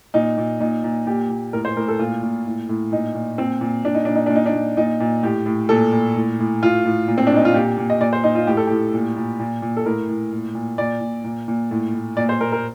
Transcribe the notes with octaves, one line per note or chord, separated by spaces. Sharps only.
A#2 D#4
A#2
A#2 D#4
A#2
A#2 G4
A#2
A2 A#4
C5
A2 A#4
A4
A#2 F4
A#2
A2
A2
A#2 D#4
A#2
A#2 C4
A#2
A#2 D4
D#4
A#2 D4
D#4
A#2 D4
D#4
D4
A#2
A#2 D#4
A#2
A2 G4
A2
A#2 A4
A#2
A2
A2
A2 F4
A2
A#2
C4
D4
A#2 D#4
F4
A#2 G4
A#2
D#5
A#2 D5
C5
A#2 D#4
F4
A2 G4
A4
A2 G4
A#2
A#2
A#2
A#2
A4
A2 A#4
A2
A#2
A#2
A#2 D5
A#2
A#2
A#2
A2
A2
A#2 D5
C5
A#2 A#4
A#4